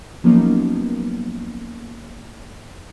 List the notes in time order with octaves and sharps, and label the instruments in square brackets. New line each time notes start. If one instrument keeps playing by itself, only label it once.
[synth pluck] F3 F#3 A#3 B3 C#4 D#4